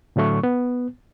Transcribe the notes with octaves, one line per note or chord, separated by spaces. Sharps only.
A2 D3 F#3 A3 C#6
B3